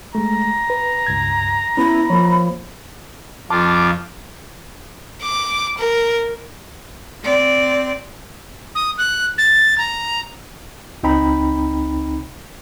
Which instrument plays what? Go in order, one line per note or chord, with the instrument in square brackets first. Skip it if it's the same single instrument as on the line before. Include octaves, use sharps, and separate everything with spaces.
[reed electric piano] G#3 A3 [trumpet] A#5
[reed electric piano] B4
C#2 G2 G#6
[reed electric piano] B3 C#4 [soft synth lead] E4 [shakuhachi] B5
[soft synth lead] F3 [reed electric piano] A#3 C#5
[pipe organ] F2 F4 [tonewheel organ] A5 D6
[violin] D6
A#4
[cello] C4 D5
[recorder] D#6
F#6
A6
A#5
[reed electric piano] C#2 C4 D#4 G5 A#5 B5